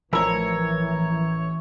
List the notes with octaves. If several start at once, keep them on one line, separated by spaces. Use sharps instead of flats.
A1 E3 F3 A#4 C#5 A#5 B5 E6